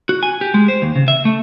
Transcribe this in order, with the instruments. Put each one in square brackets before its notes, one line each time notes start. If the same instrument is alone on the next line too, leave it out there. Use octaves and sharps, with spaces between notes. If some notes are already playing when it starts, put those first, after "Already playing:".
[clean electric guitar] F#4
G#5
G4
G#3
C5
D#2
C#3
E5
A3